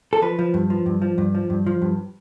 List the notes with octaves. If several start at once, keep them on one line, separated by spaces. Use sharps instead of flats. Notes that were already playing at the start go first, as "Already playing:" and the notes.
A4
F3 B4
F3
G2
F3
G2
F3
G2
F3
G2
F3
G2